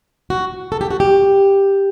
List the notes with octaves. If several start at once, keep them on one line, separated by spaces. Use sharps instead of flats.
F#4
A4
G4
F#4
G4